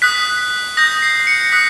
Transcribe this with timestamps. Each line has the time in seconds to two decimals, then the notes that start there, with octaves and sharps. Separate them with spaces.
0.02 D#6 F#6 B6
0.77 D#6 G6 A#6
1.02 C7
1.27 C#7
1.52 D#6 F#6 B6